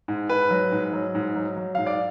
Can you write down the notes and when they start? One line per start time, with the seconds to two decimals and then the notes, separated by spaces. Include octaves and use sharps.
0.08 G#2
0.29 G#2 B4
0.51 F#3
0.72 G#2
0.93 F#3
1.15 G#2
1.36 F#3
1.57 F#3
1.75 G#2 F5
1.86 D5